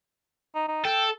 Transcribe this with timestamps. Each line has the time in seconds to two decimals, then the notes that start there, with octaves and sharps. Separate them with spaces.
0.55 D#4
0.68 D#4
0.85 A4 G5